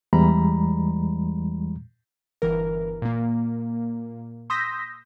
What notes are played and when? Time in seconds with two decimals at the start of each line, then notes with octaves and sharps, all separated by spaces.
0.13 E2 E3 G3 G#3 A#5 B5
2.42 G1 E3 A#4
3.02 A#2 A#3
4.50 C6 D#6 E6 G6 A#6 B6